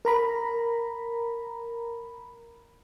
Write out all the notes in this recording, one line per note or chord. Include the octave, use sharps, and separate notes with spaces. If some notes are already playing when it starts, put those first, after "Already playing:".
A#4 A#5 B5